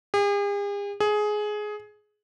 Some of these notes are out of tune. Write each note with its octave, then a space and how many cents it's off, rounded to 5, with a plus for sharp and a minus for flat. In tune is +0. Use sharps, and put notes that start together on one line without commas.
G#4 -45
G#4 +15